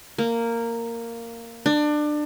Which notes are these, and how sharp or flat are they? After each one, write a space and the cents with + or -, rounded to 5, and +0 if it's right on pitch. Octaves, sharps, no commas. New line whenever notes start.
A#3 -10
D4 +25